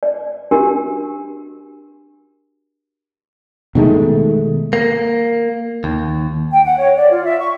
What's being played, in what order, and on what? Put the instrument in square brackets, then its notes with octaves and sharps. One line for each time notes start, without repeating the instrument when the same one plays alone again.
[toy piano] D5
D4 F#4 G4 A#4
[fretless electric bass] B2 D#3 G#3 A3
[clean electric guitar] A#3
D#2
[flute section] G5
F#5
C#5
D5
F4
E5
C#6